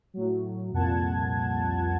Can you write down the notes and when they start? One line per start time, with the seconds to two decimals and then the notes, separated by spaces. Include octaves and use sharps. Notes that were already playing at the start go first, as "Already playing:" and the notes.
0.14 A2 F#3
0.72 C2 F2 A#2 F#5 A5 G#6